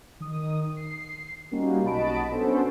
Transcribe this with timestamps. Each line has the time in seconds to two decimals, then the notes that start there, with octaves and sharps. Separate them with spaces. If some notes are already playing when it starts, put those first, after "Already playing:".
0.20 D#3 D#6
0.77 C7
1.51 G3 A#3 C#4 D#4 F#4
1.83 B1 F#4 D#5 A5 B5 D7
2.31 B3 C#4 D4 F#4 A4 C5